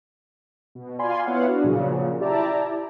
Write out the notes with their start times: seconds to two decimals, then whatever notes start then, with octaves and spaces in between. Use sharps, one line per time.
0.75 B2
0.99 F4 D5 F5 G#5 B5 C6
1.25 B3 E4 C#5 F5 F#5
1.48 D4 F#4
1.64 A#2 C#3 F3 F#3
2.20 E4 G4 D5 E5 A5 A#5